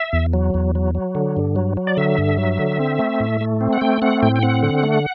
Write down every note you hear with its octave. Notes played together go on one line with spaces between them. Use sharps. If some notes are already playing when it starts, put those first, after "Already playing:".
Already playing: E5
E2
F#3
E2
F#3
F#3
D3
G2
F#3
F#3
D5
D3 E5
G2
F#3
D3
C4
A3
A2
A3
C4
F#5
A3 G5
C4 F#5
A2 G5
G5
C4 F#5
D3
A3